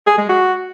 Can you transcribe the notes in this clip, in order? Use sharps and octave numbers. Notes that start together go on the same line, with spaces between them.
G#4
G#3
F#4